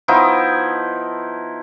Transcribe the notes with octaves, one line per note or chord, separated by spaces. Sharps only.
F3 B3 D#4 E4